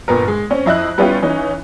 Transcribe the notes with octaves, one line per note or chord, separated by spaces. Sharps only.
G1 A#2 B3 A#4
G#3
C4 C#4
F2 E4 D#5 F#6
G3 B3 C#4 E4 F4 G4
E3 C#4 D#4